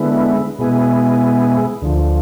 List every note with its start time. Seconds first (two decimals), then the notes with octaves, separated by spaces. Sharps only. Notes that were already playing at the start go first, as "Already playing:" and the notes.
Already playing: D3 G#3 B3 E4
0.59 B2 G#3 B3 E4 G#4
1.82 D2 D3 F3